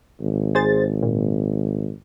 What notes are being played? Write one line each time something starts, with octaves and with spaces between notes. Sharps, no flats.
G#1
G#4 C5 A6
A#2